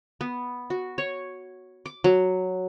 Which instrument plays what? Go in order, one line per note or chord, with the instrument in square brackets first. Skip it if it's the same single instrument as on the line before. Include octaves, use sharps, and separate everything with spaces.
[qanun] B3
F#4
C#5
D6
F#3